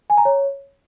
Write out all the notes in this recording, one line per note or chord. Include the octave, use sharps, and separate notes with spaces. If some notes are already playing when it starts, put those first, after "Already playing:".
G#5
A#5
C#5